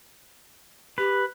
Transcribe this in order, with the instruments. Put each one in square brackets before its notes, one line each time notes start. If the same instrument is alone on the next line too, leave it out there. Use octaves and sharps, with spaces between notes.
[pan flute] G4 [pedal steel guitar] B4